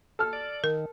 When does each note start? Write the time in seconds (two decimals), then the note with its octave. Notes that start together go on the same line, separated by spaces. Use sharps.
0.19 A4 F6
0.33 D5
0.64 D#3 A#4